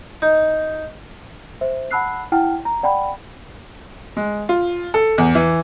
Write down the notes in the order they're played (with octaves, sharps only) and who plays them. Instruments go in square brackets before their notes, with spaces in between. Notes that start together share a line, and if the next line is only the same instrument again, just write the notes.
[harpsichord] D#4
[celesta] C5 E5
F#5 A5 B5 E6 F#6 C7
E4 F#5 G5 A5 F6
A#5
D5 F#5 G5 A5 B5
[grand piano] G#3
F4
A4
E2
E3